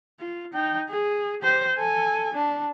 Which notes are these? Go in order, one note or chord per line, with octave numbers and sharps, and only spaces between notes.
F4
D#4 G5
G#4
G4 C5
A4 G#5
D4